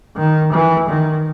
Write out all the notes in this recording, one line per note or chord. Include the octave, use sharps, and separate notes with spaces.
D#3
E3
D#3